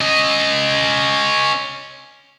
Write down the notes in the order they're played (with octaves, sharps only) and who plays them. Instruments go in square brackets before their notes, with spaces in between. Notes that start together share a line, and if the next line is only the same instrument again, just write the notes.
[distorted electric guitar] C#4 D#5